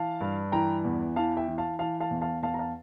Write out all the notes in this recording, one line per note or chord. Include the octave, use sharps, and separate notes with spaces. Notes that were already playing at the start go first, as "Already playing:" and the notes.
Already playing: E3 F5 A5
G2
E3 G5 A#5
E2
E3 F5 A5
E5 G5
E3
F5 A5
E3 F5 A5
F5 A5
E2
F5 A5
E2 F5 A5
A#5
F5 A5